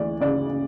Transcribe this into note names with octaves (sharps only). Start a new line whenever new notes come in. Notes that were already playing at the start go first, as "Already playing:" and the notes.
Already playing: D2 E3 D5
C#3 D5
C#3